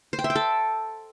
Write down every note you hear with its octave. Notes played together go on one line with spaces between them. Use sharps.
C5
G5
E5
G5
A4